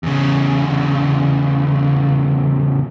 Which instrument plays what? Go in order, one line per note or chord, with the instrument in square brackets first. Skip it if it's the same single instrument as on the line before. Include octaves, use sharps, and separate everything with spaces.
[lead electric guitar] E2 C#3